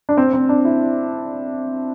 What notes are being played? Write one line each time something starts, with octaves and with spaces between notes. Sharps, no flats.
D4
C4
C4
D4
E4